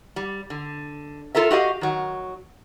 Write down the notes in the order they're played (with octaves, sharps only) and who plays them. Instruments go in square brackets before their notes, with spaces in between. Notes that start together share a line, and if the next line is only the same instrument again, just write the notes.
[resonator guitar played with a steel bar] G3
D3
F4 A4 A#4 E5
F#4 G4 D#5 F5
D#3 F#3